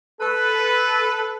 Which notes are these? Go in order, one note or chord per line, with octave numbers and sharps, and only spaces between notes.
A4 B4